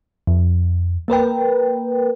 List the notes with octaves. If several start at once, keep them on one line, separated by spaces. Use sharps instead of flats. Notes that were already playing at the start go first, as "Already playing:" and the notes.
F2
A#3 A#4 B4 G5